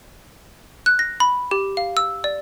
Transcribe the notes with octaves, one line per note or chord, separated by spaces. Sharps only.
F#6
A#6
B5
G4
F5
E6
D5